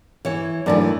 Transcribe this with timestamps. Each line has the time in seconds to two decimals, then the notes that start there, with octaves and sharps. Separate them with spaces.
0.25 E3 C#5
0.66 F#2 E3 A3 D4 D#4 D5